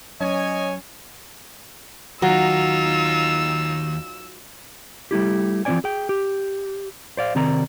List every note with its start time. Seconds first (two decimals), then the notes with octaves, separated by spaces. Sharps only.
0.21 F#3 C#4 C#5 D#5 G#5
2.22 D#2 F#3 D#4 F4 E6
5.11 G3 A3 E4 G4
5.65 E3 F3 C4 C5 D5 G#5
5.84 G#4 G5
6.09 G4
7.17 C5 D5 F5
7.35 C3 D#3 C4 A#4 D5 A#5